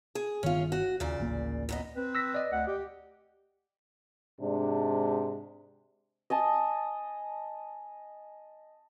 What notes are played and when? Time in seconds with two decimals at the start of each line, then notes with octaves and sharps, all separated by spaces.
0.15 G#4
0.43 G1 D#3 B3 C#4 F4
0.72 F#4
1.00 D#2 A#2 C#3 D5
1.19 D1 A1 A#3
1.69 F#2 B3 D#5
1.96 C4 B4
2.15 E6 A#6 B6
2.35 D5 D#5
2.51 D2 F#5
2.68 G4
4.40 G#2 C3 G#3 D4
6.30 D#5 G#5 A5